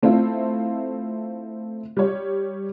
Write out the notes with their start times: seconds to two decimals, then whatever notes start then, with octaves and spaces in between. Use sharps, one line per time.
0.02 A3 C4 E4 F4
1.97 G3 C#5